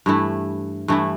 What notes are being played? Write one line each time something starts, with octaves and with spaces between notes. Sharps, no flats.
G2 E3 A3 E4
G2 E3 A3 E4